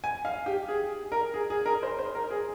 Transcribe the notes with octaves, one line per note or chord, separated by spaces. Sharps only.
G#5
F5
G4
G#4
A#4
G#4
G#4
A#4
C5
C5
A#4
G#4